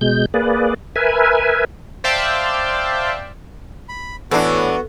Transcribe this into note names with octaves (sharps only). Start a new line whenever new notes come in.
B2 G#3 G6
A#3 G#4 B4 D5
A#4 B4 E5 G#5
C5 D5 E5 F5 G5 A5
B5
A2 E3 B3 D4 F#4